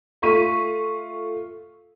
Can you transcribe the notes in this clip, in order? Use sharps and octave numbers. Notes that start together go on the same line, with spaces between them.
A3 F4 C#6 B6 D#7